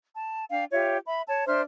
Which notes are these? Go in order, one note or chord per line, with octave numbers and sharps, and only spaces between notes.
A5
D4 F5 G5
F4 G4 C#5 E5
E5 B5
C#5 A5
D4 C5 E5 F6